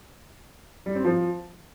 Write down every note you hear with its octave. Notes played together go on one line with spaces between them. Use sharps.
G3
C4
F3